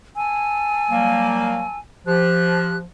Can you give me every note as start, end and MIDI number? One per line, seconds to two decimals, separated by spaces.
0.17 1.77 80
0.17 1.77 81
0.17 1.77 88
0.90 1.65 54
0.90 1.65 55
0.90 1.65 58
2.07 2.84 53
2.07 2.77 67
2.07 2.77 90